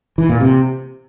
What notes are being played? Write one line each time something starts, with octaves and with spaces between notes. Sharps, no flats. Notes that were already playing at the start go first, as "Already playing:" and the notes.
E3
A#2
C3